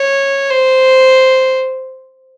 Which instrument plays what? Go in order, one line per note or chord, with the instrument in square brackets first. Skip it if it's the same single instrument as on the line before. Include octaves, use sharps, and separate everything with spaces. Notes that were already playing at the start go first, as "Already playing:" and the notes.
Already playing: [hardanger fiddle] C#5
C5